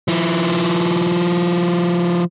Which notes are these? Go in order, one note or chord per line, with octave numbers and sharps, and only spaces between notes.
F3 E4